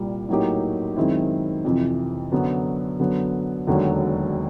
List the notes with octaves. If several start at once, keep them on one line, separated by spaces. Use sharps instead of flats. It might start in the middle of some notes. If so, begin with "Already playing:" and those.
Already playing: C2 A#2 G3
A2 F#3 A#3 D#4 G4
F#2 D#3 G#3 C4 E4
F2 C3 E3
F#2 D3 F#3 B3
F#2 D3 F#3 B3
E1 D#2 D3 F#3